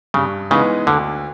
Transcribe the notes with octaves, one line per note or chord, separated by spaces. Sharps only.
G2 C#3
C#3 E3 G#3 B3 D#4
D2 D3